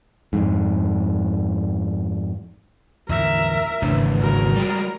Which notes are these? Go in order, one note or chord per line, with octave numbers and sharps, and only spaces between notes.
F2 G#2
E2 A2 D3 A#4 E5
G#1 E2 A2 C#3 D4
F#3 A#4
G3 G#3